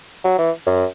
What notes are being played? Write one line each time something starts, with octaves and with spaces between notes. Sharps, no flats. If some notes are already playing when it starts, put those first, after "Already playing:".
F#3
E3
F#2